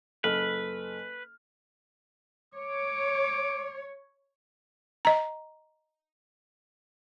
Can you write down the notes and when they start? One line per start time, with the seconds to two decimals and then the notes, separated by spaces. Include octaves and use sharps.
0.24 F#1 A4 B4 F6
2.54 C#5 D6
5.05 D#5 A#5